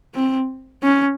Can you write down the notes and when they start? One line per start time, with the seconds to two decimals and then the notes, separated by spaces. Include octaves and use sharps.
0.15 C4
0.83 C#4